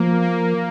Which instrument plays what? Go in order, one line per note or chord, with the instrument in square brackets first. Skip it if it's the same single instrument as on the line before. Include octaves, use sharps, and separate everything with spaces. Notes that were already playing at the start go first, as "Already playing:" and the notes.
Already playing: [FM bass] F3 [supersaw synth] A#3
[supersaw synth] A#3